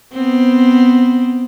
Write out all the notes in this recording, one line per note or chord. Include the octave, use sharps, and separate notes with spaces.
B3 C4